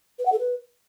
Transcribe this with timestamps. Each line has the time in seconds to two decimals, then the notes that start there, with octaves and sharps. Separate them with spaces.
0.19 B4
0.26 F#5
0.32 A4
0.39 B4